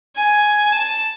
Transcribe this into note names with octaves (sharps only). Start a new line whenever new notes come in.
G#5
A5